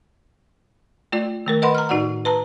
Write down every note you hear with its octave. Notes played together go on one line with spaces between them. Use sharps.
A3 F4 D5
D#3 A3 A#4
B4 D#5 F#5 B5 C6
A#5 F6
A2 D#4 F#4 D5 F#5
B4 A5 A#5